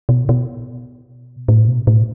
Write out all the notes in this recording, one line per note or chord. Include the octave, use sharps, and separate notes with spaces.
B2
B2
A2
B2
A2